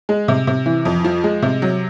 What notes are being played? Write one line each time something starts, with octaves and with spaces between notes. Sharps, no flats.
G#3
C3
C3
E3
F2
F3
G#3
C3
F#3